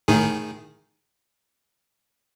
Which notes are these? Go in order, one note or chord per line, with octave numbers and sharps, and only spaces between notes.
A2 D#3 G#4